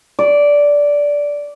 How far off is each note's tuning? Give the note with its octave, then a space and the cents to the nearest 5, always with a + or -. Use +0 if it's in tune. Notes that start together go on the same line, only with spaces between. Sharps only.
D5 -10